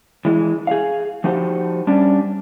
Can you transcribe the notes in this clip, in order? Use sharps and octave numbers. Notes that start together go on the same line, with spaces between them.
E3 G#3
G#4 F5
F3 D#4 F#4 G4 C5
G3 C#4 D4